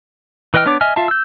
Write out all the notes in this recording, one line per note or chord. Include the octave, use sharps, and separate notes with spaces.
E3 B4 D#5 G5 F6
B3 D4 C#5 D6
D#5 E5 G#5 F6
F4 E5 F5 A5
E6 G6